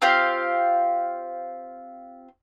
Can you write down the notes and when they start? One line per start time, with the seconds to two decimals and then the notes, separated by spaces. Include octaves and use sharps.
0.02 C4 F4 G4 F5